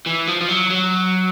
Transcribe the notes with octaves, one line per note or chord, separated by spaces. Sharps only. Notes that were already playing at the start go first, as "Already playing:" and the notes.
E3
F3
F3
F#3
F#3